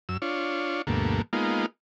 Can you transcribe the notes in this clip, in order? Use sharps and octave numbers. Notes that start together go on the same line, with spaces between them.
F#2 E6
D4 F4 C#5
D2 G2 B2 A3 A#3
G#3 A#3 B3 D#4 F4